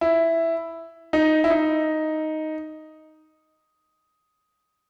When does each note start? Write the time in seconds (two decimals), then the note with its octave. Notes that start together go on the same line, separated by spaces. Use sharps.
0.01 E4
1.13 D#4
1.44 E4
1.50 D#4